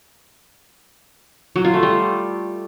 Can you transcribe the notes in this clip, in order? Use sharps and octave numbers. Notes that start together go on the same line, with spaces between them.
F#3
F4
A3
G3